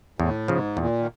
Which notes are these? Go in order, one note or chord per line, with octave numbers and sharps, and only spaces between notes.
E2 A2
G#2 C#3 F3
E2 A#2
D#3